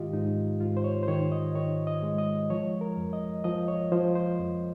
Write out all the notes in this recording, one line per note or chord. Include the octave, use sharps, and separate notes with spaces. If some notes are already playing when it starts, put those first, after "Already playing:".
Already playing: G#2 D#3 G#3 F4 G4 D#5 F5
G#2 D#4
G#2 F4
C5
C#5
C5
D#3 C#5
D#5
D#3 C#5
D#5
G#3
D#5
F3 C#5
A#4
F2
D#5
F3 D#5
C#5
F3 C5
C5
F2